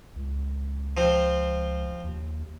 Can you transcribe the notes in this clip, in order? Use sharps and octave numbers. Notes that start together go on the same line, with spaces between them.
C#2
F3 C4
D#2